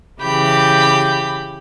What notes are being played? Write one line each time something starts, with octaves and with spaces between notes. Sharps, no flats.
C#3 E3 G4 B5 G6